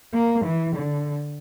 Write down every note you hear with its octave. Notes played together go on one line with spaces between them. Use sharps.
A#3
E3
D3